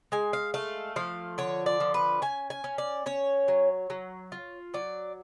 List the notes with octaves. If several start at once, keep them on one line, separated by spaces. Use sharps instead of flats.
G#3 G#5
F5
A3 F5
F3 F5
D3 C#5
D5
F3
B4
C#4 G#5
G#5
C#4
D5
C#4 C#5
F#3
F#3
F4
F#3 D5